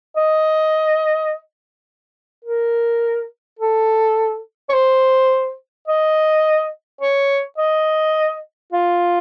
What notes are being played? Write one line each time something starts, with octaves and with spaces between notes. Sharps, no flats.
D#5
A#4
A4
C#5
C5
D#5
C#5
D#5
F4